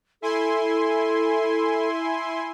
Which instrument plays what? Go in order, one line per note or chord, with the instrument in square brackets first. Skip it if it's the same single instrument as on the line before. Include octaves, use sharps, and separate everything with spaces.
[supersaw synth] E4 G#5 C6 [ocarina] A4